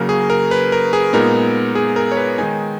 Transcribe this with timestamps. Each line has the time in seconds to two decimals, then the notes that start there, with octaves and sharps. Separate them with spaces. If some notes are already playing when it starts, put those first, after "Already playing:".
Already playing: C#3 F#3 A#3 C#4 A#4
0.09 G#4
0.30 A#4
0.51 B4
0.72 A#4
0.93 G#4
1.13 A#2 G#3 B3 D#4 A#4
1.75 G#4
1.96 A#4
2.11 C#5
2.17 B4
2.38 D#3 G#3 D#4 G#5